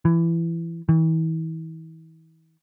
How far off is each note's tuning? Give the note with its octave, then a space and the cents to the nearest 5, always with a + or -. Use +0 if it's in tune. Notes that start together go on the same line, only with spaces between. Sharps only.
E3 +20
E3 -40